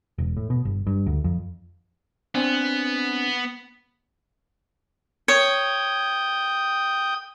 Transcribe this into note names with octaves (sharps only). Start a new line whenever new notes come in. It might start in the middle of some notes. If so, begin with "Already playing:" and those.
E1
A2
B2
G1
G2
D2
F2
B3 C4 D4 G#5
C#5 G5 D#6